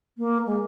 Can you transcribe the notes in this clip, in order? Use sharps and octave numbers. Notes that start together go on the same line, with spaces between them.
A#3
G#3